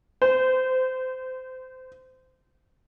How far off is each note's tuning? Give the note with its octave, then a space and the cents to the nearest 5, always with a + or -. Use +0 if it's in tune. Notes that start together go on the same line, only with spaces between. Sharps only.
C5 -25